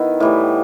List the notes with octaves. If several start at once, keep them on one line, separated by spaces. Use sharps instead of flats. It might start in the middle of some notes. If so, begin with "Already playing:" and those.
Already playing: D#3 B3 E4
A2 E3 G3